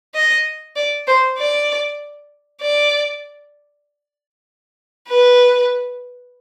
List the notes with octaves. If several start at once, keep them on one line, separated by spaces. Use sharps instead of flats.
D#5
D5
C5
D5
D5
B4